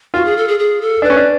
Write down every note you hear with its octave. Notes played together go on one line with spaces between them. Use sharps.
F4 F#4
G#4
A4
G#4
G#4
A4
D4 B4
C#4
D4